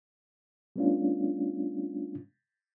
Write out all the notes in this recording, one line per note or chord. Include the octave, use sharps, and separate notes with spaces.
G3 A3 B3 C#4 D4 F4